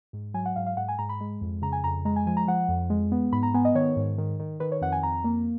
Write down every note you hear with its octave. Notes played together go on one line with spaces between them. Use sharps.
G#2
F#3 G#5
F#5
G#2 F5
F5
G#2 F#5
G#5
G#2 A#5
B5
G#3
F2
C#3 A#5
G#5
F2 A#5
G#3 A#5
G#5
F3 G#5
A#5
F3 F#5
F2
G#3
B3
G#2 B5
A#5
B3 G#5
D#5
D#3 C#5
G#2
D#3
D#3
D#3 B4
C#5
F2 F#5
G#5
F2 A#5
A#3